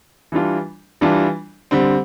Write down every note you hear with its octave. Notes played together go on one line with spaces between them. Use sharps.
E3 G3 D4 F4
E3 G3 D4 F4
D3 G3 C4